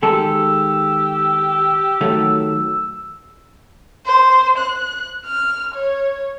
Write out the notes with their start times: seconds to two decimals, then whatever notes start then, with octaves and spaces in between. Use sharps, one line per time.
0.03 D#3 G#3 G4 A4 E6
2.01 D#3 F#3 A3
4.06 C5
4.58 F#6
5.26 F6
5.75 C#5